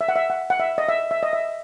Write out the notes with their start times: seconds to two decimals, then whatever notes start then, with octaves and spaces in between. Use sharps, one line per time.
0.01 E5
0.09 F#5
0.16 E5
0.30 F#5
0.50 F#5
0.60 E5
0.78 D#5
0.89 E5
1.11 E5
1.23 D#5
1.33 E5